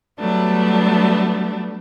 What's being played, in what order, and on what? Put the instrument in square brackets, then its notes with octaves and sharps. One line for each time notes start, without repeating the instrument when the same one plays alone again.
[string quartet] F#3 G3 A3 B3 D4